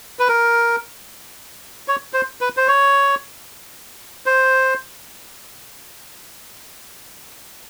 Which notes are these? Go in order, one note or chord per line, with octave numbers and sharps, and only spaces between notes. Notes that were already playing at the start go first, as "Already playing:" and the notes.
B4
A#4
C#5
C5
B4
C5
C#5
C5